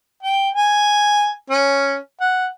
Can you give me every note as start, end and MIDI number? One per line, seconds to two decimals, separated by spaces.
0.23 0.49 79
0.55 1.32 80
1.50 1.96 61
2.20 2.47 78